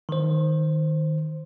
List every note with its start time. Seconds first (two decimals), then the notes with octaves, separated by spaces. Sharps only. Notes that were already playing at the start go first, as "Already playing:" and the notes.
0.09 D#3 C5